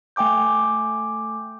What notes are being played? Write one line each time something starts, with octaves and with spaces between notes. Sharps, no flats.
A3 G5 G#5 D6 G6